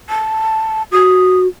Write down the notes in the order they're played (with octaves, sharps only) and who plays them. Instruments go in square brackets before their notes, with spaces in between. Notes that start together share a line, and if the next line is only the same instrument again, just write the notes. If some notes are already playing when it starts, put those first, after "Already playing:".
[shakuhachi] A5
[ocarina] F#4 [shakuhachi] D#6